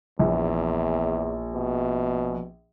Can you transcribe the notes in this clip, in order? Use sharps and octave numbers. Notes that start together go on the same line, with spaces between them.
A#1 E2
B2